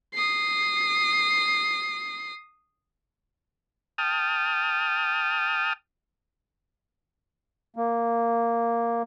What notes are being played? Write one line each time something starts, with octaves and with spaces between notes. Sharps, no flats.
D#6 C7
G5 A5 D#6 F6
A#3